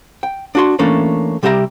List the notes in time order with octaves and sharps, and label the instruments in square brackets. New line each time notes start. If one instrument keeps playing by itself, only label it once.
[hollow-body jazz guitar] G5
D4 F#4 C6
E3 A3 A#3 C#4 D4
C3 G3 G4 E5 F5 A#5